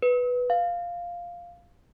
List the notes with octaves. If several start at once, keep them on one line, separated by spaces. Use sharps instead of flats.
B4
F5